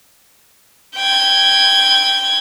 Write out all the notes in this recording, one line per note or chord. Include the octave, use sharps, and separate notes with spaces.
G5 G#6